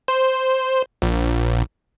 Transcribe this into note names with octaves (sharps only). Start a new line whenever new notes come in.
C5
A#1